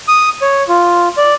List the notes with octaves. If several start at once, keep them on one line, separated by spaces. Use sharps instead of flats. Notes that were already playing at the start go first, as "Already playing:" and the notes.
D#6
C#5
F4
D5